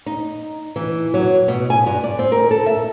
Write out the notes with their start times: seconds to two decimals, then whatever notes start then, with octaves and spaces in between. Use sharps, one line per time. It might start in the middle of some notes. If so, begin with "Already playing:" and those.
0.06 D#4
0.76 E3
1.14 F#3
1.48 B2
1.70 G#5
1.86 G2
2.04 D5
2.19 C4
2.32 A#4
2.51 A4
2.66 E5